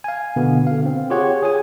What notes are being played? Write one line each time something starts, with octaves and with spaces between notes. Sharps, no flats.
F5 G#5
B2 D3 B3
D3 F5
C4
F4 G4 G#4 C#5 F#5
G#4 C#5 G#5